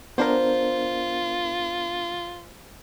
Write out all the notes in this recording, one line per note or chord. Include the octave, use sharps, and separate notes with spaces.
B3 D4 F4 A#4 C5